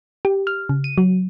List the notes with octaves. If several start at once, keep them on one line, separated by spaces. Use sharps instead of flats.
G4
F6
C#3
D#7
F#3